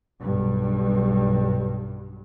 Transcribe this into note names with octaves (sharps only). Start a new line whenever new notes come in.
B1 G2